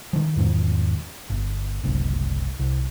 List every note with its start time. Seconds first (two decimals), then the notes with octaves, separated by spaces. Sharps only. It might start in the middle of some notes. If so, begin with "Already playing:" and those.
0.13 D#3 F3
0.36 E2 G#2 D#3
1.30 G1
1.84 F#1 C2
2.60 C2